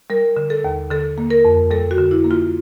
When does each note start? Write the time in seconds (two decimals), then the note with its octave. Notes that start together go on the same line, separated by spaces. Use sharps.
0.10 G3 A#4
0.37 D3
0.50 A4
0.64 D#2
0.91 D3 A4
1.18 A#3
1.31 A#4
1.45 F2
1.71 G3 A4
1.91 F#4
1.98 D3
2.11 E4
2.24 A#3
2.31 F4